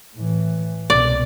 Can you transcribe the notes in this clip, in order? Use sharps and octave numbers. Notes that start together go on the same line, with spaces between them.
A2 E3
C2 B2 D5